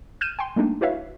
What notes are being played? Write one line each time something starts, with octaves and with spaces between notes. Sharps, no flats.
F6 G6 D#7 E7
G5 G#5 C6
G3 A3 A#3 D4 D#4
E4 F#4 B4 C#5 E5 F5